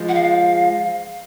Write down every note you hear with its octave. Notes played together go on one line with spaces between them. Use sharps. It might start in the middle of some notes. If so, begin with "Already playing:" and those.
Already playing: F3 G#3
F#5
F5